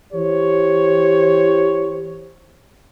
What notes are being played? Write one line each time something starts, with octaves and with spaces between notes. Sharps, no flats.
E3 G4 C5 C#5